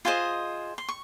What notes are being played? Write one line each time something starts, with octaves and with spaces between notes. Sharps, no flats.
F4 G#4 C5 D#5 C6
C6
C#6